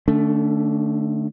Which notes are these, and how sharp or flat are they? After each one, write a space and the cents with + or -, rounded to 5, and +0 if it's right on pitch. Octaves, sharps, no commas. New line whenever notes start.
D3 +40 A3 +5 D4 -40